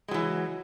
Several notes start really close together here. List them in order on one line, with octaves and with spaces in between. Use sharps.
G#3 F#3 E3